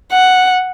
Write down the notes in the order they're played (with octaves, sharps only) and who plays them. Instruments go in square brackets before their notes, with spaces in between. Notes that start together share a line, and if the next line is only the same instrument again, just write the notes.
[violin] F#5